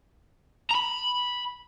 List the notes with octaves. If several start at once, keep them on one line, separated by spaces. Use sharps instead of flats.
A#5 B5